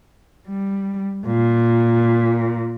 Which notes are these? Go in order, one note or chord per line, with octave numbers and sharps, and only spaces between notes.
G3
A#2